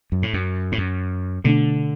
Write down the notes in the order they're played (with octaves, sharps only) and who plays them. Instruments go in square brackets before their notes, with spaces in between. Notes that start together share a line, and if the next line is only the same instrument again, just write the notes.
[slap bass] F#2
A2
F#2
A2
F#2
[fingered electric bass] B2 A3 D4 [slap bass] D3